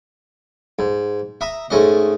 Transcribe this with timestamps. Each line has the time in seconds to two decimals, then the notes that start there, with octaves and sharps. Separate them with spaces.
0.79 G#2
1.41 E5 A#5 D#6
1.70 G#2 A3 C#4 D#5